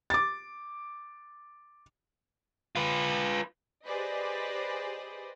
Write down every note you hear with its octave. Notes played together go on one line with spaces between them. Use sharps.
D6 A6
F4 B4
G4 G#4 B4 C5 D5 D#5